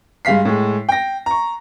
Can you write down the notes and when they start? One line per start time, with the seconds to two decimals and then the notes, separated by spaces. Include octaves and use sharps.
0.25 G2 G#3 F5 B6 C7
0.45 A2 G#3
0.89 G5 A#6
1.26 A#5 C#6